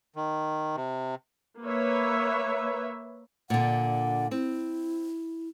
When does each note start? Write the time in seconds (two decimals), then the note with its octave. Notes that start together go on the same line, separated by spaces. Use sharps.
0.16 D#3
0.77 C3
1.63 A#3 B4 C#5 E5
3.50 A#2 D3 F#5
4.31 C4 E4